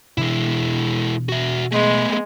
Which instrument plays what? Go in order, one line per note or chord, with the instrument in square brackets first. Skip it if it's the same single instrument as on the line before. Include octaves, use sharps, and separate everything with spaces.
[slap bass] B2 E3 D4 [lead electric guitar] G#3 E4
[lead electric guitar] F#4 E5
[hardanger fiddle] G#3 [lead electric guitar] A3 B3